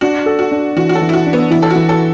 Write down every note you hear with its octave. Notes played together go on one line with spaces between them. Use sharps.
D4 F#4
A4
F#4
D4
E3 F#4
F#4
A4
E3
E4
F#4
D4
B3
E3 E4
A4
F#4
E3
A4